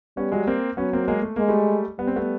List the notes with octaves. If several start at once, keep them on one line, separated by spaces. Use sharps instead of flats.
G3 B3 C#4
F#3 G#3
A#3 C4
F#3 B3 C#4
A#3 C4
G#3 A#3
A3
G#3 A#3
G3 A3
G3 B3
C4
A3 B3